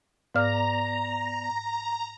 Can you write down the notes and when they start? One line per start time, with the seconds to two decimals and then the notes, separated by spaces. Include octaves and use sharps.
0.34 G#2 B3 D5 F5 A#5 F6